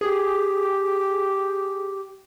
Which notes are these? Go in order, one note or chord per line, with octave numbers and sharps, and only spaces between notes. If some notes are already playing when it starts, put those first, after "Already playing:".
G4 G#4